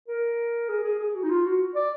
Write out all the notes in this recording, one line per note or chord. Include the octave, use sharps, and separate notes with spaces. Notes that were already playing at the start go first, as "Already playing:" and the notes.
A#4
G#4
G#4
G#4
F#4
D#4
F4
F#4
D5